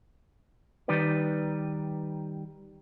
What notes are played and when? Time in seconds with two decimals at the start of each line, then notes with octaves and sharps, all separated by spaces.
0.88 D#3 G3 D#4 B4 D5